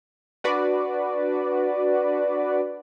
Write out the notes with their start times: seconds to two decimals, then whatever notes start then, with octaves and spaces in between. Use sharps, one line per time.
0.44 D4 F#4 B4 D5